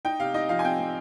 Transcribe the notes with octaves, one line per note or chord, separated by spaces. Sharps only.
D#4 G5
C3 F5
D#4 D#5
F3 F5
G#5
C4 G5
C4